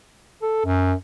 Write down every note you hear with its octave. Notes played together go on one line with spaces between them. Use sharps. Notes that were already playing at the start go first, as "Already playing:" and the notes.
A4
F#2